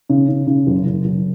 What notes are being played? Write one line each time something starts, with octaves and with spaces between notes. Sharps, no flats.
C#3
C#3
C#3
F#1
F#1
F#1